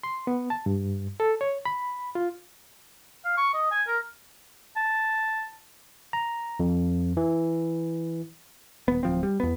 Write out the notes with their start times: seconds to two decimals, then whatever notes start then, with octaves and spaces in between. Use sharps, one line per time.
0.03 C6
0.27 B3
0.50 A5
0.66 G2
1.20 A4
1.41 C#5
1.65 B5
2.15 F4
3.25 F5
3.37 C#6
3.54 D#5
3.71 G#5
3.88 A#4
4.76 A5
6.13 A#5
6.60 F2
7.17 E3
8.88 D#1 B3
9.03 D1 F3 C4
9.23 G3
9.40 E2 B3